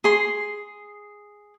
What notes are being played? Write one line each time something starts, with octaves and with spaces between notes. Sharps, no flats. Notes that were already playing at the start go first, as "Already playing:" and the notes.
G#4 C6